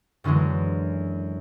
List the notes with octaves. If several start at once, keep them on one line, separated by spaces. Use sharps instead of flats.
F#2 D3 E3 F#3 G#3